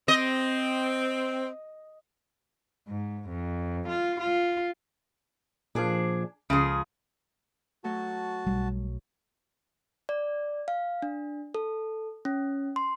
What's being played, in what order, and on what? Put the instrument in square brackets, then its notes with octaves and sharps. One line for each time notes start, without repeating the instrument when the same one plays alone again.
[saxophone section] C4 [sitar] D#5
[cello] G#2
F2
F4
F4
[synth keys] A#2 F3 [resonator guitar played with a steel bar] D4 G#4
[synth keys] C#2 [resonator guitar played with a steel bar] C#3 F3 G#4
[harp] F#3 A3 [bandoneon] F#4 A5
[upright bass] B1 [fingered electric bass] G3
[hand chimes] D5
F5
D4
A4
C#4
C6